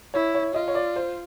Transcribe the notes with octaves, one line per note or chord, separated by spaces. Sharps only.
E4 C#5
C#5
F4 D#5
C#5
D5
C5